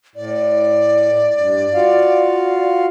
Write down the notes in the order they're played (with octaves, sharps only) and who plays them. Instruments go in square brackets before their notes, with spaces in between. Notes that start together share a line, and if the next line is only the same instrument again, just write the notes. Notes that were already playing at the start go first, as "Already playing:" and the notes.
[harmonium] A2 [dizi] D5
[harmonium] G2
F4 F#4 F5